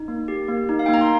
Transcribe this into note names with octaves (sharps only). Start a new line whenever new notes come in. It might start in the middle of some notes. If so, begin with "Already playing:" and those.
Already playing: D#4
A#3
G4
A#3
D#4
F5
A#3 G5
A#5
C6